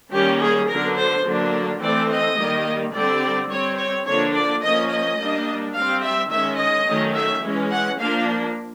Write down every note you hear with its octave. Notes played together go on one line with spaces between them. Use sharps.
D#3 G3 A#3 C#4 G4
G#4
D3 F#3 B3 D4 A#4
C5
D3 F#3 A#3 D4
E3 A3 C4 D5
D#5
D#3 G3 A#3
D3 G3 C4 D5
G3 C4 C#5
C#5
D3 F3 A#3 D4 C#5
D5
F3 A#3 C#4 D#5
D#5
G3 A#3 D4
G3 C4 F5
E5
D#3 G#3 C#4 E5
D#5
D#3 F#3 A3 C#4
E5
E3 G#3 C#4
F#5
F3 A#3 D4 F5